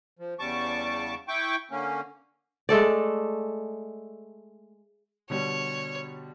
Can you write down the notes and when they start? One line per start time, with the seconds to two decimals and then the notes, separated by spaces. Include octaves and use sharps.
0.19 F3
0.39 E2 C#3 G3 A5 C#6 D6
1.28 E4 G5 C#6 D6
1.71 D3 A#3 C#4
2.69 G#3 A3 A4 D5
5.30 B2 D3 G3 C#5